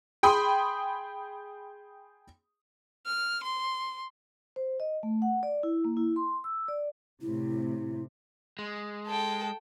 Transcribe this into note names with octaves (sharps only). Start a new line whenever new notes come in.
G#4 G5 B5 C6 D#6
F6
C6
C5
D#5
A3
F#5
D5
E4
A#3
E4
C6
E6
D5
A2 C3 E4
G#3
A4 G5